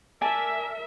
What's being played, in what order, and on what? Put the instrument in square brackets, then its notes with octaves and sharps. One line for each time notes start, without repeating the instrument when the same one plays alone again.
[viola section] A#4 E5 [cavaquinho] D5 G#5 A5